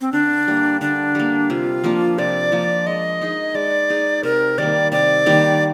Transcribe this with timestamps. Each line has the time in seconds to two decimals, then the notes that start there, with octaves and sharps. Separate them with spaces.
0.01 C4
0.12 D3 D4
0.48 G3 A#3
0.81 D3 D4
1.15 G3 A#3
1.50 C3 F4
1.84 F3 A#3 D4
2.18 C3 D5
2.52 F3 A#3 D4
2.86 G#3 D#5
3.21 D#4 G#4
3.54 G#3 D5
3.90 D#4 G#4
4.23 C3 A#4
4.58 D#3 G3 A#3 D5
4.92 C3 D5
5.26 D#3 G3 A#3